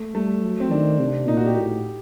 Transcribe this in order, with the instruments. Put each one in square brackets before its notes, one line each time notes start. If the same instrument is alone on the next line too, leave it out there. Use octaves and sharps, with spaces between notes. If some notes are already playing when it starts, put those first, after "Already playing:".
Already playing: [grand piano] A3
[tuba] G3 [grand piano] A3
[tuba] F#3
[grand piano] C4
[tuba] D#3 [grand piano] D4
[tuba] C3
[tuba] A#2 [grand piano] D#4
[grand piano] F#4
G4
[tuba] A2